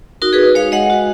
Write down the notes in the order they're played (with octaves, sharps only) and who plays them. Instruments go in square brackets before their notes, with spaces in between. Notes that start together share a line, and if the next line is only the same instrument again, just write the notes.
[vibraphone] D#4 F#4 A#4
G#4 B4
D#4
G#3 C#5 F5
G#3 D#5 F#5
F#4